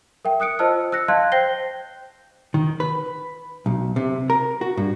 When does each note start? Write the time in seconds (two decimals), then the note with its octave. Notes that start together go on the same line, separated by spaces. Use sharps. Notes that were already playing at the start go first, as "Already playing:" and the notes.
0.25 A#4 E5 G5
0.40 D#6 F#6 C#7 D7
0.59 F4 C5 D#5 A5 E6 F6
0.92 E6 F#6 A#6 C#7
1.08 D#5 F5 A5 C6 F#6 G#6
1.32 C5 G5 G6 A#6 C7 G7
2.54 D#3
2.80 B4
3.66 B1
3.96 C3
4.30 A#4
4.61 F#4
4.77 G2